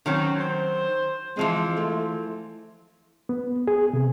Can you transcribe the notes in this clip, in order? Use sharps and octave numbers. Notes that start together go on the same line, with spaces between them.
D#3 F#3 C4 C#4
C5
E3 F3 G#3 C4
A3
B3
G#4
C3